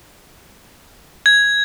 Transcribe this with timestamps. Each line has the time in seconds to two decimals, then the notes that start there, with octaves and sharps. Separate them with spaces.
1.26 G#6